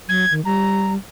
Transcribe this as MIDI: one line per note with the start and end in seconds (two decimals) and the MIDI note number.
0.09 0.25 54
0.09 0.33 92
0.31 0.43 51
0.45 0.96 55
0.45 0.93 82